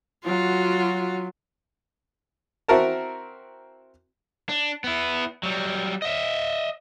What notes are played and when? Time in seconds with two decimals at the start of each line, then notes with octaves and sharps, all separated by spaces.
0.25 F#3 F4 F#4
2.68 C4 E4 F#4 A#4 A5
4.49 D4
4.84 B3 E4
5.43 F#3 G3
6.02 D#5 E5